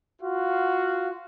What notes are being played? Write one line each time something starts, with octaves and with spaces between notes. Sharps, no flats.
F4 F#4 F5